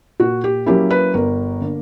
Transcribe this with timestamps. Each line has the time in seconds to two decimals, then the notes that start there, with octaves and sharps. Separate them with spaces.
0.20 A#2 F#4
0.44 G4
0.66 F#3 A#3 C#4 E4 G4
0.90 B4
1.14 G1 A#4
1.61 D3 A#3